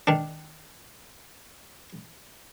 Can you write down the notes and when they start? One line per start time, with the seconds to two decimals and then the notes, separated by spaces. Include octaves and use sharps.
0.07 D#3 D4